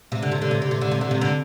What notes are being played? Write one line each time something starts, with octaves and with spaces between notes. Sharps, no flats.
C3
D3
C3
D3
C3
D3
C3
D3
C3
D3
C3
D3